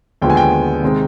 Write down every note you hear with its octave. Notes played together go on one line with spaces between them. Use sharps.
D#2 D3 F3 G#3 B3 G5
G#5
G5
C3 D#3 G#3 C4